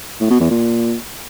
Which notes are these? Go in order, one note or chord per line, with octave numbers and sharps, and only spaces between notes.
A2
B2
E2
A#2